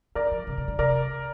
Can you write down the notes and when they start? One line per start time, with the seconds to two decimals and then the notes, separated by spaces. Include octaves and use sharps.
0.15 D#3 A#4 D5
0.31 F3
0.47 C3
0.57 C3
0.68 D3
0.78 C3 A#4 D5